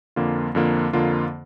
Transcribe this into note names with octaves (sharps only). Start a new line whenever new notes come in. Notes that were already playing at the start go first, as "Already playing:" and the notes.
F2 D3 A#3 F4
F2 D3 A#3 F4
F2 D3 A#3 F4